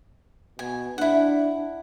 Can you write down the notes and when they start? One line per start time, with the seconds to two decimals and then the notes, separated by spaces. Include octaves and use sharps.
0.59 B2 G#5
0.98 D4 E4 F#5